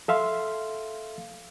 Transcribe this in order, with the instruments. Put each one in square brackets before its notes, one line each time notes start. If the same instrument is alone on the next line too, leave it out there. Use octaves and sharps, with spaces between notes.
[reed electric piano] A4 E5 F5 C6